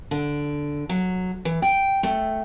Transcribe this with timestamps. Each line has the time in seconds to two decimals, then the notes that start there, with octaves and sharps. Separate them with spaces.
0.11 D3
0.89 F#3
1.45 E3
1.62 G5
2.03 A3